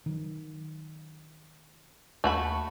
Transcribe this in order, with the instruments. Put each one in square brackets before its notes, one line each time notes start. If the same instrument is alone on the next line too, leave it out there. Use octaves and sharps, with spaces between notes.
[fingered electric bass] D#3 F#3
[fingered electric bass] D#2 [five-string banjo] A3 F#4 B5